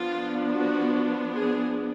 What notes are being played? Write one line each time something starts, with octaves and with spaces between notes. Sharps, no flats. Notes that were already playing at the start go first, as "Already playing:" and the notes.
Already playing: F3 B3 D4 F4
F#4
G#4